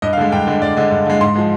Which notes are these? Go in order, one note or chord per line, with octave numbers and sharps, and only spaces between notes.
G2 D#5
F5
D3 G#3
G2 G5
D3 G#3
G2 D5
D3 G#3
G2
D3 G#3
G#2 C6
F3 G#3